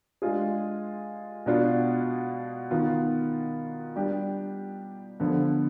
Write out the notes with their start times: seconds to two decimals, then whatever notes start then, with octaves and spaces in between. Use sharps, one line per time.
0.22 G#3 D4 F4 G#4
1.46 B2 B3 D4 F4
2.71 D#3 B3 F4
3.96 G3 D4 G4
5.20 D3 F3 B3